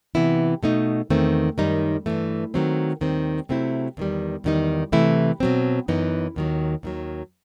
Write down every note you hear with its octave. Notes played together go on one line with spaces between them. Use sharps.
C3 E3 B3 E4
B2 A3 D#4
E2 D#3 A3 C4
F#2 D#3 G3 D#4
G2 E3 A3
D#3 F#3 A3 C4
D#2 D#3 G3 C4
C3 F#3 A3 C4 E4
E2 D#3 G3
E2 D#3 G3 D#4
C3 E3 A3 E4
B2 F#3 C4
F#2 E3 B3 D#4
D#2 D#3 F#3
D#2 D#3 F#3